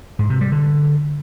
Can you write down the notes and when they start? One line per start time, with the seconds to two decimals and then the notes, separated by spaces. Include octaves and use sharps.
0.19 G#2
0.30 C3
0.41 G3
0.52 D3